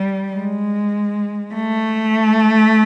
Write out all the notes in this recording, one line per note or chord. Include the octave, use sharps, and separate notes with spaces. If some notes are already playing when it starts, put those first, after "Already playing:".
Already playing: G3
G#3
A3